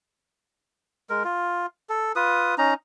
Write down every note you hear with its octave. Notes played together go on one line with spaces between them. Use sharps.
G#3 A#4
F4
A4
F4 B4 D#6
C#4 D#4 A#5